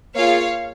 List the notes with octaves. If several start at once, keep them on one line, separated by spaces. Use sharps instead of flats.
A#3 F4 G#4 C#5 F5